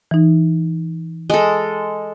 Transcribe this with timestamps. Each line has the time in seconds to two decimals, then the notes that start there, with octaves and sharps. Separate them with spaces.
0.11 E3 D#4
1.30 G#3 A4